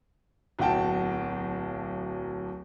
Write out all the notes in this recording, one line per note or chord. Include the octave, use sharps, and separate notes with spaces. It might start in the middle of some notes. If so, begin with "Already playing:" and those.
D1 B1 F#4 G5 A5